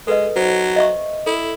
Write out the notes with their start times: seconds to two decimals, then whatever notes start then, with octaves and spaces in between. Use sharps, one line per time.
0.07 G#3 A4 B4 D#5
0.36 F#3 C5
0.76 D#5 E5 C#6
1.26 E4 A4